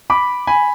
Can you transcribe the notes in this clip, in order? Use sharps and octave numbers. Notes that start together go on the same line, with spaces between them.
B5 D6
G#5 B5